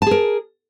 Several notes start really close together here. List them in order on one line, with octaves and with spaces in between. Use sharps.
A5 G#4 A#4